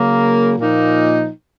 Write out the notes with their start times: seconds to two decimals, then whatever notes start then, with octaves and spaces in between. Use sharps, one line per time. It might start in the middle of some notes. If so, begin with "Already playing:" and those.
Already playing: C#3 F#3 A#3
0.58 A#2 F3 A#3 D#4